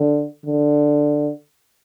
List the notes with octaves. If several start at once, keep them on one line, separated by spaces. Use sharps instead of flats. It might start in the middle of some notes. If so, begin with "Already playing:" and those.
Already playing: D3
D3